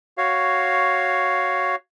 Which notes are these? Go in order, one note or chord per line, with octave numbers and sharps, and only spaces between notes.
F#4 C#5 F5